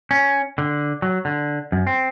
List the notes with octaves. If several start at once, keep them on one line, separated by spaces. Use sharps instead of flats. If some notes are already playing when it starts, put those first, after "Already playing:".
C#4
D3
F#3
D3
F#2
C4